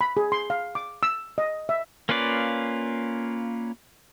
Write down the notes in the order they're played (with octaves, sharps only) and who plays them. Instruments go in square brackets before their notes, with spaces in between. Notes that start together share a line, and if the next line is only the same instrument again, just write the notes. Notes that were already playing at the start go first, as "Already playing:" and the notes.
[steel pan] B5
G#4
C6
F5
D6
E6
D#5
E5
[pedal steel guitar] A#3 C#4 F4 B4 D5